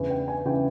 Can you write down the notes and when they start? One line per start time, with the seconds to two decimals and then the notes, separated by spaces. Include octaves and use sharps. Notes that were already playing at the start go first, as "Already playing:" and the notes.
Already playing: E2 C#3 E3
0.10 G5
0.28 G#5
0.46 C#3 E3 G5